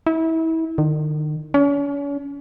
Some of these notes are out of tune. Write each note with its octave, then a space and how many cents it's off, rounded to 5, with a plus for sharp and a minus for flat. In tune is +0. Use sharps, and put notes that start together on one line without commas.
E4 -30
D#3 -40
C#4 +40